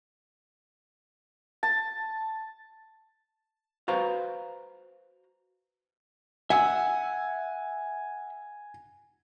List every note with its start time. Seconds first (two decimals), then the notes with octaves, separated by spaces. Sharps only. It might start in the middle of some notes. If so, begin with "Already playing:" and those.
1.63 A5
3.88 F#4 B4 C5 F5 A#5
6.50 E5 F#5 G#5 E6